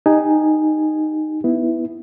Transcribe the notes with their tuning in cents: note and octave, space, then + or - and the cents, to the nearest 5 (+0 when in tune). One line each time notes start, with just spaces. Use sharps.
D#4 -10 G4 +20 G#5 +0
B3 +0 E4 +0